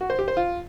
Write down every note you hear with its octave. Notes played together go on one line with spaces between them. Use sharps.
F#4
C5
G4
C5
F4